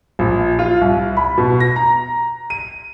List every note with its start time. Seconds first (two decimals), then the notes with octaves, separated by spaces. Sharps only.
0.19 A#1
0.59 F4
0.81 C2
1.17 B5
1.38 B2
1.60 A#6
1.76 A#5
2.50 D#7